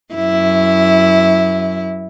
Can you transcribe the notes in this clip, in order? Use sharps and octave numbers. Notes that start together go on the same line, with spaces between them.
F#2 E4